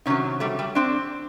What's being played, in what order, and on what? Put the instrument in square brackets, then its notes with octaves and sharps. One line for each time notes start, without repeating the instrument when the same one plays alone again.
[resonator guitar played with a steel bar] C3 D#3 F#3 C#4 D#4
G3 A3
G3 A3
C4 D4